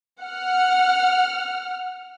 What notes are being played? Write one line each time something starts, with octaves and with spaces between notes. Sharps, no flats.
F#5 F6